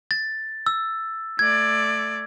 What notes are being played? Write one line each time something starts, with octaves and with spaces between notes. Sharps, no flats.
A6
E6
A3 D5 G#6